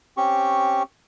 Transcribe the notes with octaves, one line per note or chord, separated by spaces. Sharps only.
C4 C#4 G4 C#6